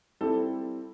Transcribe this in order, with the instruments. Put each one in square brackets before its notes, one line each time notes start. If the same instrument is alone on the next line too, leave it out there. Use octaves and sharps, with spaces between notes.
[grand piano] G3 C4 E4 G4 [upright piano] A4